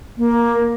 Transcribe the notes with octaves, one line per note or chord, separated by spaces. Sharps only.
A#3